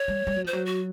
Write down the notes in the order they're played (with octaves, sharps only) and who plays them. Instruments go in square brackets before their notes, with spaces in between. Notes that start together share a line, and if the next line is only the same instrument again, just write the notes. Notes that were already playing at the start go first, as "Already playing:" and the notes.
Already playing: [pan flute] C#5
[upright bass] G3
G3
F#3
[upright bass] F3 [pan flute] C5
[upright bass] F#3
[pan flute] F#4